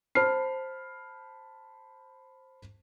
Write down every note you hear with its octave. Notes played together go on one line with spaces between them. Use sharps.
C5 A5 B5 F6 C7